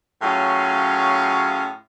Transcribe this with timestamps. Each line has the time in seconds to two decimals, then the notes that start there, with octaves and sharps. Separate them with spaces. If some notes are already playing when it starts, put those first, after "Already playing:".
0.22 A2 F#3 C#4 F4 G#4 F5